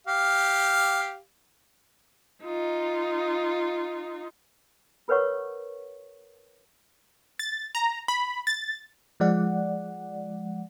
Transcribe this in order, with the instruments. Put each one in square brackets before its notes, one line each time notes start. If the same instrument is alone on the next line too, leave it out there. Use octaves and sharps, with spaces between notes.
[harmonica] G4 F5
[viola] D#4 F4
[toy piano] F4 A#4 B4 C#5 F#5 C#6
[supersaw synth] A6
A#5
B5
A6
[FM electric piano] F3 G#3 D5 F#5